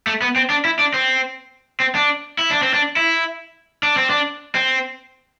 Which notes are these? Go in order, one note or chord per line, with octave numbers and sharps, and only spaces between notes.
A3
B3
C4
D4
E4
D4
C4
C4
D4
E4
D4
C4
D4
E4
D4
C4
D4
C4